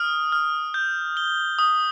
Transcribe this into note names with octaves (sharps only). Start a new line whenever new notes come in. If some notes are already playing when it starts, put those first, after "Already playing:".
Already playing: D#6 F6
F6
G6
G7
D#6